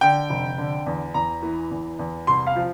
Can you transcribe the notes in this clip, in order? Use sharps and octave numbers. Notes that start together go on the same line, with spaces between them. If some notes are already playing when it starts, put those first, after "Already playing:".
D3 G5
F1
D3
E2
E2 A#5
E3
E2
E2
C2 C6
F5
F3